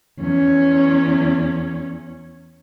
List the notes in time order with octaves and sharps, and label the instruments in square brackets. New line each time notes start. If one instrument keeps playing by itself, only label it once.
[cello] E2 C#4